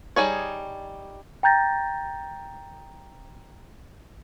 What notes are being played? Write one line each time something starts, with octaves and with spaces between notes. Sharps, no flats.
G3 D#4 G#4 C#5
G5 A#5 G6 A6 A#6